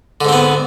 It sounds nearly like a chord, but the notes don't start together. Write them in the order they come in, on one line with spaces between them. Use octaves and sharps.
D3 G#2 C4 B3